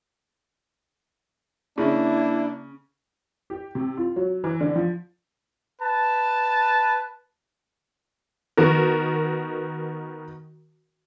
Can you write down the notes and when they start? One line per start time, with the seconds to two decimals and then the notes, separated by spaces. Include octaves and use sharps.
1.78 C#3 A#3 D4 E4
3.50 G4
3.75 C3
3.97 F4
4.16 F#3
4.44 E3
4.61 D3
4.76 F3
5.80 B4 A5
8.57 D#3 B3 F#4 A#4